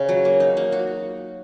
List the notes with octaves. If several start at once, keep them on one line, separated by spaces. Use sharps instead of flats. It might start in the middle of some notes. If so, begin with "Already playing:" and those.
Already playing: C#3
F#3
A#3
D#4
A#3
F#4